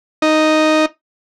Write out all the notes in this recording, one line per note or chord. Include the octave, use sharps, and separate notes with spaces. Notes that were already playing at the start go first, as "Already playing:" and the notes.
D#4